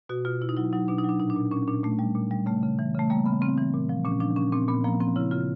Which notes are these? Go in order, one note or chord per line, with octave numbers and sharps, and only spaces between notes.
B2 F#4
B2 F4
B2 E4
D#4
F#3 E4
F#3 D#4
B2 D4
D#4
F#3
D4
A#2 D#4
D4
A#2
A#2 C#4
A#2 D4
A#2 A3
G3
A#2
G3
C#3 A3
C#3
E3
C#3 A3
G3 A#3
C#3 B3
C#3 C4
E3
A#2
F3
A#2 C#4
F3 D4
A#2 C#4
A#2 C4
A#2 B3
F3 A#3
F3 C4
C#3 E4
C#3 F4